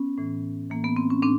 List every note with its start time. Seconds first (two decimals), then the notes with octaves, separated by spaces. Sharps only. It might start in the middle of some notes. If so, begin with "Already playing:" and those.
Already playing: B3 C#4
0.18 A2 E3
0.70 A2 E3 A#3
0.84 B3
0.96 C4
1.10 C#4
1.22 A2 C4 D4